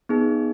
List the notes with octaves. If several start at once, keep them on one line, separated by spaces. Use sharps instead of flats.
B3 D#4 G#4